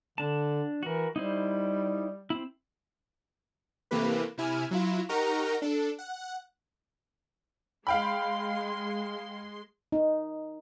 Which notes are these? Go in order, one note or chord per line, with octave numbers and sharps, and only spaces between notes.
D3 D4 A5
E3 F#4 A#4
G3 D#4 E4 C5
C4 E4
C3 E3 A3 A#3 G4 B4
C3 E4 G#5 F6
F#3 E4 F4
D#4 G4 A#4 F#5 A#5 C#6
D4 A4
F#5
G#3 F5 G5 B5 C6
D#4